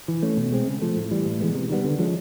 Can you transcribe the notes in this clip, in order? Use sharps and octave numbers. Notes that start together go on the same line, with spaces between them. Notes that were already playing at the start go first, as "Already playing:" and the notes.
E3
A3 C#4
B2
G#3 C4
C#3
F3 A3
A2
E3 G3
A2
E3 G#3 B3
C3
D#3 G3 B3
D3
F3 G#3 C#4